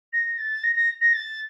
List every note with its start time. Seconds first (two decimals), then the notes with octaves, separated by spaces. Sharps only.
0.13 A#6
0.38 A6
0.63 A#6
0.75 A#6
1.01 A#6
1.13 A6